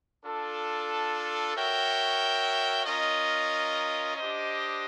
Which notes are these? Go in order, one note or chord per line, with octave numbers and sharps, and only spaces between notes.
D4 F4 A4
F#4 A#4 C#5 E5 G5
C#4 F4 A#4 D#5
D4 G4 C5 D#5